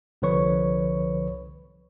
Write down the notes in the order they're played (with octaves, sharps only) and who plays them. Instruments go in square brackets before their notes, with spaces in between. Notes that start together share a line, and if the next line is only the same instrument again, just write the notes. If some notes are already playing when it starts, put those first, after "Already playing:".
[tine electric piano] C2 D3 F3 B4 C#5 C#6